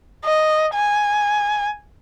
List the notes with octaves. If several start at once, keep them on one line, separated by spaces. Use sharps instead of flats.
D#5
G#5